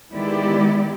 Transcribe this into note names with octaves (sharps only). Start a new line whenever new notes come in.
D#3 G#3 B3 E4 G4 D5